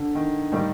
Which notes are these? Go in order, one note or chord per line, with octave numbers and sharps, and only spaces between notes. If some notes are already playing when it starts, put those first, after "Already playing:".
Already playing: D3
D#3
A2 D#3 G3 A#3